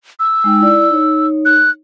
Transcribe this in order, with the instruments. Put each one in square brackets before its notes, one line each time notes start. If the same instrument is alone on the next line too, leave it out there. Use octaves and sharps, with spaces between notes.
[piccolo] E6
[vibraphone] G#3 D#4 G5
E4 D5
D#4 C#5
[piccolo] F#6